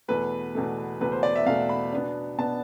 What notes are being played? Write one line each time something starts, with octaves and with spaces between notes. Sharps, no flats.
E2 B2 A3 B4
E2 B2 A3
E2 B2 A3 B4
C5
D5
E5
E2 B2 A3 F5
B5
B2 B3 D4
B2 B3 D4 A5